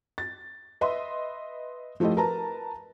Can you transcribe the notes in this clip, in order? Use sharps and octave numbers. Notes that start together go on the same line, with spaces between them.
A6
B4 D#5 E5 C6
F3 A3 E4 F4 G4 D#5
A#4 B4 A5 A#5